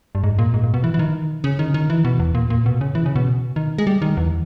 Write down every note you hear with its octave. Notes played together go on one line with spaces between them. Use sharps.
G2
G#2
A#2
G#2
A#2
B2
E3
E3
D#3
C#3
D#3
D#3
E3
B2
E2
A#2
A#2
B2
C#3
E3
C#3
B2
D#3
G#3
G3
D#3
E2